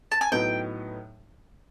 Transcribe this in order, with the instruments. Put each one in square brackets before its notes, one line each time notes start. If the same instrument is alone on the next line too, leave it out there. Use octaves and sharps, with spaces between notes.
[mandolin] A5
G#5
[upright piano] A2 F#3 B3 D#4 [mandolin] G5